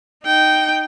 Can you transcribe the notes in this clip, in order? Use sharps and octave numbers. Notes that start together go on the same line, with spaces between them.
D#4 G5